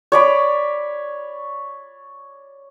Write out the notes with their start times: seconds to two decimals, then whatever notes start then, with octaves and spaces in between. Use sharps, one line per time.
0.12 C#5 D5 B5